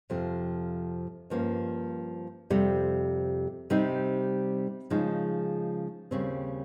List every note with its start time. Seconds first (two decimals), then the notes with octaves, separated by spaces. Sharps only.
0.10 F2 C3 F3
1.30 G2 F3 A#3 C#4
2.50 F2 C3 G3
3.70 C3 G3 C4 D#4
4.90 C#3 F3 G#3 D#4
6.11 D#2 C#3 G3 C4